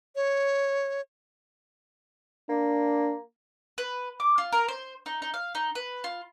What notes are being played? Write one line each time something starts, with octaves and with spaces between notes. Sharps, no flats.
C#5
A#3 D4
B4
D6
F4
A#4
C5
D#4
D#4
F5
D#4
B4
F4